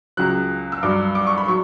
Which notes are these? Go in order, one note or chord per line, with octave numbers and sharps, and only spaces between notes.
C#2 C#3 F#3 F#6
E6
G2 F#3 D6
D6
C#6
B5
F#3 C#6